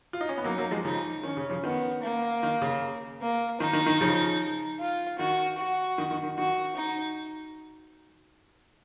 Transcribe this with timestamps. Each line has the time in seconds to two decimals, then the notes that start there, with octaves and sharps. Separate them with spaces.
0.13 F4
0.21 D#4
0.29 C#4
0.38 B3
0.44 F#3 A#3 D#4
0.58 F#3 A#3
0.71 F3 G#3
0.84 C#3 F3 D#4
1.23 D#3 C#4
1.37 C#3
1.50 C#3 F3
1.64 D#3 B3
2.02 A#3
2.43 D#3
2.62 C#3
3.21 A#3
3.60 D#3 D#4
3.73 D#3
3.87 D#3
4.01 C#3 F3
4.79 F4
5.19 D#3 F#4
5.58 F#4
5.98 D#3
6.11 D#3
6.23 D#3
6.37 D#3 F#4
6.76 D#4